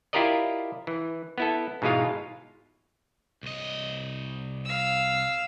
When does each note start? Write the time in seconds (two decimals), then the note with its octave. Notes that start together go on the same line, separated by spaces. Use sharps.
0.13 E4 F4 G4 A#4 D5 D#5
0.87 E3
1.38 B3 E4 A4
1.82 G#2 B2 E3 G#3 F4 F5
3.43 C2 D#5
4.65 F5 E6